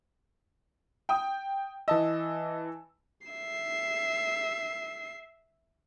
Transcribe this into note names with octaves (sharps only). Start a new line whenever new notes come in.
G5 D#6
E3 D#5 A5 E6
E5 C7